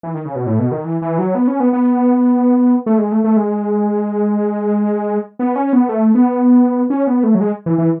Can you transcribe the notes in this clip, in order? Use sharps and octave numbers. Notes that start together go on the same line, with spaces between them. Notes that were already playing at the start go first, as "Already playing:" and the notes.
E3
D#3
C#3
B2
A2
B2
D#3
E3
E3
F#3
B3
C#4
B3
B3
A3
G#3
A3
A3
G#3
B3
C#4
B3
A3
B3
C#4
B3
A3
F#3
G#3
E3
E3